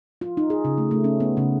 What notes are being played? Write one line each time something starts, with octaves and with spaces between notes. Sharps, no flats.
F4
D#4
G#4
C#3
A3
A3
C#4
B3
C#3